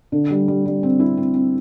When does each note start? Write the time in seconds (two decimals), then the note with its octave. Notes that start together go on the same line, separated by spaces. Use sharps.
0.12 D3
0.30 G3
0.48 G3
0.66 G3
0.83 C4
1.00 E4
1.17 C4
1.34 C4